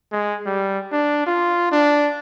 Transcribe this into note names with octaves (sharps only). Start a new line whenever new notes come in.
G#3
G3
D4
F4
D4